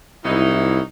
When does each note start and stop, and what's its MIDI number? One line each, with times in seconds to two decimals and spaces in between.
0.25 0.80 36
0.25 0.82 51
0.25 0.82 54
0.25 0.82 63
0.25 0.80 64